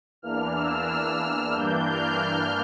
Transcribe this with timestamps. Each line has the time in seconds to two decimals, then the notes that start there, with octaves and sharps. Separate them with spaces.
0.22 E2 E3 A#3 D4 F6
0.55 E6
0.88 F6
1.54 G2 E3 A#3 D4 G6
1.87 F6